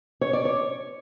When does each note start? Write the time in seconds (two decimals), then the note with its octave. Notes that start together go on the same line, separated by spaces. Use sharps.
0.21 C#5
0.33 D5
0.45 C#5